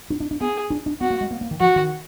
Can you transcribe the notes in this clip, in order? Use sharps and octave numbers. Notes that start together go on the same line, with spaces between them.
D4
D4
D4
B3 G#4
D4
D4
B3 F#4
A#3
G#3
A#3
A#3
D#3
F3 F#4
D#3